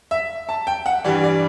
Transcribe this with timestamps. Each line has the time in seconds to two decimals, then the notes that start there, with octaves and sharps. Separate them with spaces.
0.11 E5
0.49 A5
0.67 G5
0.86 F#5
1.04 G2 E3 G3 D5
1.24 D5